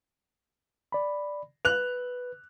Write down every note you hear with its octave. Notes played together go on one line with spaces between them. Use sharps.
D5 B5
B4 F#6 F7